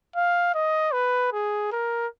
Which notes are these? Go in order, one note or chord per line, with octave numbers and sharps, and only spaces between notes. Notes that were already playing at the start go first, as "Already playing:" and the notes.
F5
D#5
B4
G#4
A#4